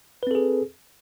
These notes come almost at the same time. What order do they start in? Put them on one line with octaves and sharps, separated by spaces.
B4 C4 A4 G#4